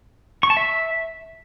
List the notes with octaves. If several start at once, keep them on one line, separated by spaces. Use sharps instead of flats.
C#6
A5
E5